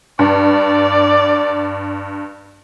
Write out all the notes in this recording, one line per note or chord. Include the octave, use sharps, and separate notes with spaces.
G2 D5